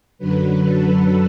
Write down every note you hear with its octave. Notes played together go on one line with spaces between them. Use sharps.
F#2 D3 F#3 B4
A4